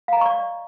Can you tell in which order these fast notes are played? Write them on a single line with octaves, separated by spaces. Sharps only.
F5 A#5 D#5 C#6 D5